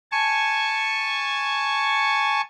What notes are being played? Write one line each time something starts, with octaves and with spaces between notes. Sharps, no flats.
G#5 A5 C#6